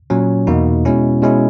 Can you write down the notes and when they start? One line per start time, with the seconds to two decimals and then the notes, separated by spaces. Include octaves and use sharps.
0.10 A#2 F#3 C#4
0.47 E2 B2 A#3 D#4
0.85 B2 G#3 C#4 E4
1.22 B2 G#3 C#4 E4